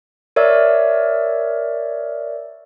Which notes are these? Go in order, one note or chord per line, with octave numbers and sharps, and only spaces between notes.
A#4 C#5 D5 E5 E6